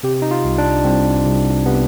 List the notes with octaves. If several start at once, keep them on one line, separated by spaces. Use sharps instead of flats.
C3 G4
D#4
F4
C2
D4
C2 C4
C2
C3 B3